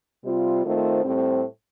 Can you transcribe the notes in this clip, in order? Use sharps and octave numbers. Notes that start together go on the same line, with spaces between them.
C3 G3 C4 F4
D#3 A3 C4 F4 C5
A2 G3 C4